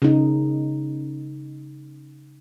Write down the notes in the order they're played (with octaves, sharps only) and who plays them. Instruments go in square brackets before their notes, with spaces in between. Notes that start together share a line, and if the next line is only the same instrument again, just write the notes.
[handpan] C#3 D#4